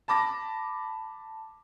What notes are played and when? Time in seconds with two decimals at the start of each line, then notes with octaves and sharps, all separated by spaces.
0.08 A5 B5 D6 A#6